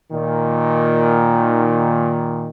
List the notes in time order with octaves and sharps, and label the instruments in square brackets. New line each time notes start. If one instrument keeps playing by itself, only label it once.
[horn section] A#2 D#3